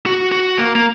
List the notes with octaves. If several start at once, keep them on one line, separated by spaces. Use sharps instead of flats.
F#4
F#4
A#3
A#3